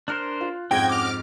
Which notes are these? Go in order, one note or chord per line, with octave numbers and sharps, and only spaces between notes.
D4 A#4 C5 F6 F#6
F4
F2 G#2 C#4 F#4 D#5 G5 G#6
D6 F6